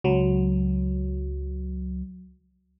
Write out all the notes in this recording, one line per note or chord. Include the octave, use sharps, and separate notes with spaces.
C#2 F#3